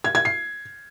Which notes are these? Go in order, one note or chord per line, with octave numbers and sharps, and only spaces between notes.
G#6
G#6
C7